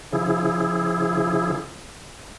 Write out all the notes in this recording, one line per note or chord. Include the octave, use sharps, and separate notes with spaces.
C#3 F3 E4 G#4